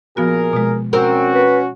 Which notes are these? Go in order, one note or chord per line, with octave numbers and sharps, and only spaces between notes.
A#2 F3 B3 F#4 G#4 A#4
B2 G#3
C4 C#4 F#4 A#4
B4